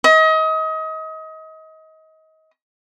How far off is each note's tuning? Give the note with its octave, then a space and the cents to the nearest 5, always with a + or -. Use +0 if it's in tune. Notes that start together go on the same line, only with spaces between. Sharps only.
D#5 +30